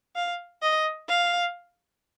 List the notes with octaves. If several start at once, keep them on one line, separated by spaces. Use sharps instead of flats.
F5
D#5
F5